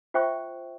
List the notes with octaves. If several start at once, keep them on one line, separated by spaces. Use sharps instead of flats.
F4 C5 E5 G5 C#6